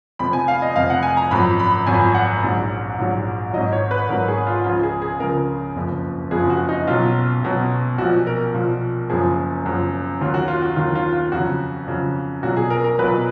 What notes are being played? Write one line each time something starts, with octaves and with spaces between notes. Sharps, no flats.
F1 F2 F3 B5
G#5
F5
D#5
F1 F2 F3 F5
F#5
G#5
A#5
G#1 F#2 F3 B5
B5
G#1 F#2 F3 G#5
F#5
A#1 G#2 F#3
A#1 G#2 F#3
G#1 G#2 F#3 D#5
C#5
B4
G#1 G#2 F#3 A#4
G#4
F4
C#2 C#3 F3 F4
G#4
G#4
C#2 C#3 F3 A#4
F#1 F2 F3
F#1 F2 F3 G#4
F#4
D#4
B1 B2 F#3 F4
B1 B2 F#3
B1 A#2 F3 F#4
A#4
B1 A#2 F3
F#1 F#2 F3 G#4
F#1 F#2 F3
D#2 D#3 F#3 F4
F#4
F4
F#4
D#2 D#3 F#3 F4
F4
F4
F2 C#3 F#3 F#4
F2 C#3 F#3
B1 A#2 F#3 F#4
G#4
A#4
A#4
B1 A#2 F#3 B4